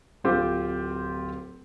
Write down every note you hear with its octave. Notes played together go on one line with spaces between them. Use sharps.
D1 C4 F4 G4